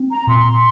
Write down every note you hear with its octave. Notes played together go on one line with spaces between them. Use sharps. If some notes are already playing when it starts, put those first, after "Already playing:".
Already playing: C4
A#5
A#2 C6